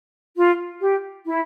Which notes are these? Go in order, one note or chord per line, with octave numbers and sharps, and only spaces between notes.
F4
G4
E4